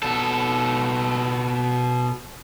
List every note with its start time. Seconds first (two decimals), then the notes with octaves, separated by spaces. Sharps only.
0.03 B2 A4